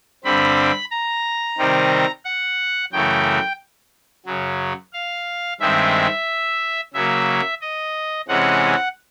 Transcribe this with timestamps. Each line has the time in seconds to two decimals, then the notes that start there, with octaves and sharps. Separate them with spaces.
0.24 G2 D3 G3 C4 B5
0.91 A#5
1.58 C3 D#3 G3 C4
2.25 F#5
2.92 F#2 C#3 E3 A3 G5
4.26 F#2 C#3 F#3
4.93 F5
5.60 G2 D#3 G#3 C4 E5
6.94 C#3 F#3 A#3 E5
7.61 D#5
8.28 C3 E3 G#3 C#4 F#5